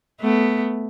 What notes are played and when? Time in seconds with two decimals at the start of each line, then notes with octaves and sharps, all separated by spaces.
0.21 A3 B3